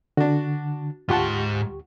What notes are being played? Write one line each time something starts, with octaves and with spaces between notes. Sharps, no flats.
D3 D4 F#4
D2 G#2 F4 G4 F#5 A5 C6 C#6